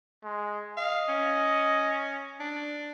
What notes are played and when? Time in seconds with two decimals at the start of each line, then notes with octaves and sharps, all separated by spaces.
0.24 G#3
0.77 D#5 F5
1.09 C#4
2.39 D4